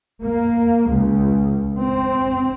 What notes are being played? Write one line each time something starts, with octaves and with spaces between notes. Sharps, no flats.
A#3
C#2
C4